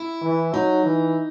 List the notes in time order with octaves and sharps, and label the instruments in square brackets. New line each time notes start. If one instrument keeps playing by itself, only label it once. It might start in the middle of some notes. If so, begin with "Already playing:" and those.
Already playing: [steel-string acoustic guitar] E4
[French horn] E3
[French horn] F#3 [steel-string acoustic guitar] D#4
[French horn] E3